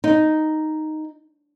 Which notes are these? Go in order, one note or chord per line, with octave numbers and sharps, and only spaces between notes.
D#4